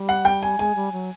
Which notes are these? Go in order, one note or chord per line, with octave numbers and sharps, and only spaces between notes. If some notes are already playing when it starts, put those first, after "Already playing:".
Already playing: G3
F#5
G5
G#5
G#3 G#5
G3
F#3